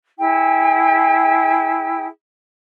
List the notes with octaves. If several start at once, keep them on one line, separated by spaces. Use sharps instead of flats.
E4 G#4 G5